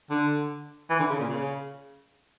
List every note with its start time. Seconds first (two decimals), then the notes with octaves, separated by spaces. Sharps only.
0.10 D3
0.90 E3
1.00 D3
1.10 C#3
1.20 A#2
1.30 C#3